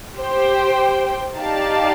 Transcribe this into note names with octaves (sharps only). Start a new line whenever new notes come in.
G4 C5 G5
D#4 G4 D5 F5 A5